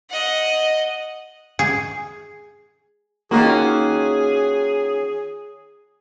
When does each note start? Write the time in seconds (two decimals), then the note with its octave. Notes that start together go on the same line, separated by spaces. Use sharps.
0.10 D#5 F#5
1.59 G#4
3.31 D#3 A#3 C#4 F4 F#4 G#4